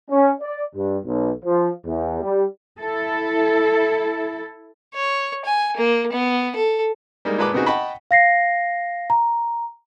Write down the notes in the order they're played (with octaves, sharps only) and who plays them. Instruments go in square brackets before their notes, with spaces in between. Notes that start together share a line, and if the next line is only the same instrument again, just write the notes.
[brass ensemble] C#4
D5
G2
B1
F3
E2
G3
[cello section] E4 A4
[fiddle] C#5
G#5
A#3
B3
A4
[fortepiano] G3 G#3 A#3 D#4
A#2 G#3 B4 A5 B5 D6
C#3 B3 C4 D#4 F#4 G#4
D#5 F#5 G5 A5 B5 C#6
[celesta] F5 A#6 C7
A#5